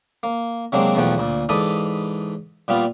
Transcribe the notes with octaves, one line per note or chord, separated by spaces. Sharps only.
A#3
C3 F#3 G#3 A#3 C4 D4
B1 E2 F3 A3 F#5 G5
D2 A#2
G#2 E3 A4 D5 B5 D#6
A#2 G3 B3 F4